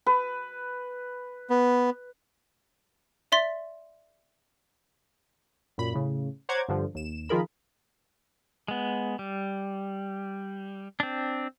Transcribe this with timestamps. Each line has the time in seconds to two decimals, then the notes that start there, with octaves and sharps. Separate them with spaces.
0.07 B4
1.50 B3
3.32 D5 E5 C6 A6 B6
5.78 F#2 A#2 B5
5.94 A2 C#3
6.49 C5 C#5 F#5 A#5 D6 G#6
6.68 G2 D3 F3
6.95 D#2 E7
7.29 D#3 F3 F4 G#4 A#4 B5
8.68 G#3 B3
9.19 G3
11.00 C4 D4